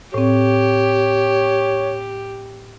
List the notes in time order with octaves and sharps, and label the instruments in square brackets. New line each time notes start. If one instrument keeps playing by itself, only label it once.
[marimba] A2 C4 [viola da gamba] G4 [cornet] C#5